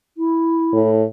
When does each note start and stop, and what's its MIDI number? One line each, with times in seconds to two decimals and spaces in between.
0.18 0.91 64
0.73 1.03 45